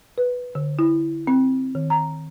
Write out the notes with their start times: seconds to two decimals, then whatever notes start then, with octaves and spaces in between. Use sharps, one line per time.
0.18 B4
0.55 D3
0.79 E4
1.27 C4
1.75 D#3
1.90 A#5